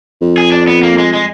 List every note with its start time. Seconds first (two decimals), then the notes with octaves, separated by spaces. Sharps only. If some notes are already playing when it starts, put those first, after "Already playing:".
0.21 F2
0.38 G#4
0.52 D4
0.67 B3
0.83 A#3
0.98 G#3
1.13 G#3